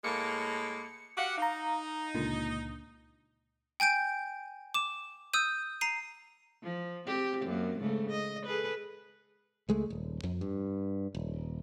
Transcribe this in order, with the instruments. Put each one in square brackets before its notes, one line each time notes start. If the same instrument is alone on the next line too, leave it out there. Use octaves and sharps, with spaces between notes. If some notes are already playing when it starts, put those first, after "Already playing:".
[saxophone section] A2 G#3 A#3 [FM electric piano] C#7
[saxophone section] F#4 G4 F#5 [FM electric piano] F5 D6
[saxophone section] D#4 [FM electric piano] F5 A#5
[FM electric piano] C#2 A#2 D3
[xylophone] G5 G#5 G6 D7
D6 E7
D#6 E6 G6 D#7
A#5 C7 D#7
[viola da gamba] F3
C4 G4
F#2 A#3
G#2 C#3 A3
D#5
G#4 A4 B4
[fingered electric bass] C#2 G#3 A3
D#1
F2
G2
D#1